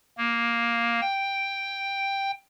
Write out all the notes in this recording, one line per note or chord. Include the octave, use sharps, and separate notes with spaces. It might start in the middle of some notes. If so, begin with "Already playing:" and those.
A#3
G5